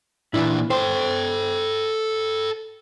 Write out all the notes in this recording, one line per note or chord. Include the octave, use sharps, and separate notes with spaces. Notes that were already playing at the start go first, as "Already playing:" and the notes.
A#2 E3 D4 E4
A4 C5 G5